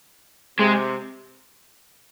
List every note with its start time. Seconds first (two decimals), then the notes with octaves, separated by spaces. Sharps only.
0.59 C3 G#3